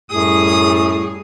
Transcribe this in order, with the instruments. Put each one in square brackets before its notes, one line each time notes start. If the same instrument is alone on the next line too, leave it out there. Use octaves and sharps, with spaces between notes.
[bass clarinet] F#2 [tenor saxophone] A2 [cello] G3 G#4 [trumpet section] D#6